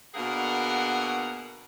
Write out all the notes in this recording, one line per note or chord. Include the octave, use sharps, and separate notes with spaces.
B2 D3 A#3 G#4 A#4 F#5